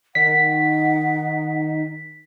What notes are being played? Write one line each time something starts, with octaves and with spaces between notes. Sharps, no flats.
D#3 F#5 B6